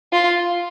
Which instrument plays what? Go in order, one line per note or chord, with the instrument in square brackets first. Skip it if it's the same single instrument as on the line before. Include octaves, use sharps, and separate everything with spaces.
[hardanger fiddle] F4